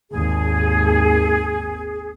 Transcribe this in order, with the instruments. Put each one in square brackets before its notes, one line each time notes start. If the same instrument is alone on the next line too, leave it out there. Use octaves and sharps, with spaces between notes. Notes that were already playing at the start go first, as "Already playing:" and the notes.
[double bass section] G#1 D#2 [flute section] G#4